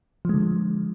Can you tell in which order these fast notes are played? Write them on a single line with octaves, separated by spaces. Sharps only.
F3 G#3 D3